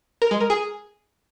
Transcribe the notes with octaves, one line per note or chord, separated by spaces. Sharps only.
A#4
G#3
A#4
G#4